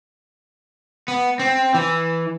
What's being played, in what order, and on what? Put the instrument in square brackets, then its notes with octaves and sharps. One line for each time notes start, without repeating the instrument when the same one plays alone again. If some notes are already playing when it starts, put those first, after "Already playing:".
[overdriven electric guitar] B3
C4
E3